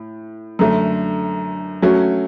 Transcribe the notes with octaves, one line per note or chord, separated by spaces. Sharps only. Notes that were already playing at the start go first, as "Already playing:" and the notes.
Already playing: A2
F#2 D3 A3
F#3 A3 C#4 F#4